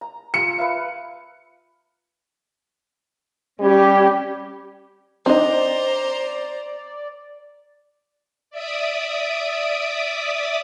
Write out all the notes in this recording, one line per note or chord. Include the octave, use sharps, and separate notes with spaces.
A#5
F4 A#5 C#7
B4 E5 F5
G3 C#4 G4
C4 D4 D#4 C5 D5 D#5 A#5
D5 E5 D6 D#6